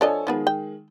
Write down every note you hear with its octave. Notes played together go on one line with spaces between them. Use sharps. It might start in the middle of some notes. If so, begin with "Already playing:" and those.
F3 D4 A4 C#5 D#5 G#5
D#3 F3 G#3 B3 B4
G5